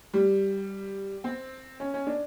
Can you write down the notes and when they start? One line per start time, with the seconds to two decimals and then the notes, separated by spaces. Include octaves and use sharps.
0.14 G3
1.24 C4
1.80 C#4
1.94 C#4
2.07 D4